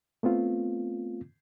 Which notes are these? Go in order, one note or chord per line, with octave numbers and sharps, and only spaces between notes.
A3 B3 C4 F4